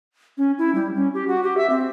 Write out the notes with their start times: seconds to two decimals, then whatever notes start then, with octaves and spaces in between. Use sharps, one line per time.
0.38 C#4
0.58 E4
0.75 G3
0.95 C#4
1.14 G4
1.28 F#4
1.44 G4
1.57 E5
1.70 C4